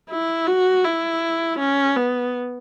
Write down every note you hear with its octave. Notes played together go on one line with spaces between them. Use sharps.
E4
F#4
E4
C#4
B3